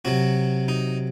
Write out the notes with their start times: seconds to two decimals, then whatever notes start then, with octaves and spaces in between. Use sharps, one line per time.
0.05 C3 F#3 F#4
0.68 D#4